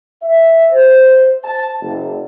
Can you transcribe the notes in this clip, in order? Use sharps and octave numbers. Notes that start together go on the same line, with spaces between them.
E5
C5
A5
F#1